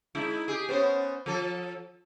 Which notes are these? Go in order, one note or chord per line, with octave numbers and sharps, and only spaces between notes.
G#3 D#4 E4
G4 G#4
B3 C#4 C5
F3 A4